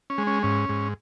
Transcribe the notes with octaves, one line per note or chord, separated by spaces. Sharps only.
C#4
G#3
C#4
G#2 C#4
G#2